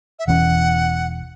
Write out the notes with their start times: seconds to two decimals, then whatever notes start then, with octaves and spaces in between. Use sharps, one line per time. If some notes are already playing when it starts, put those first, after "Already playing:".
0.19 E5
0.27 E1 E2 E3 C#4 F#5